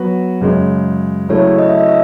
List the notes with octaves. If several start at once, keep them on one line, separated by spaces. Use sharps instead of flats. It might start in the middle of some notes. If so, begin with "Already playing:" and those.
Already playing: F#3 B3 F#4 B4
F#2 C#3 G#3
C#3 F#3 A3 C#4 E4 C#5
D#5
E5
D#5
E5